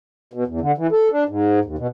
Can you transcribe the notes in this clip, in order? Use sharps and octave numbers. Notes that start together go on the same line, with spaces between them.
B2
E2
D3
E3
A4
D4
G#2
D#2
B2